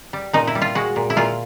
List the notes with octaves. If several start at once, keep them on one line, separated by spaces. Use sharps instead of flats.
G3
A#2 D#4
E4
G3
F4
G#3 F#4
A#2
E4
A#2 F4